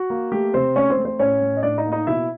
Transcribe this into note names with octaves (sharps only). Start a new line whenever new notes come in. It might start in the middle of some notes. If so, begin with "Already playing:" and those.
Already playing: F#4
A#3
A3 G4
C3 C4 C5
A3 C#4 C#5
C4 C5
A3
C4 C5
A2 C#4 C#5
A2
D#5
A2 D4 D5
D#4 D#5
A#3
D#4 D#5
B2 E4 E5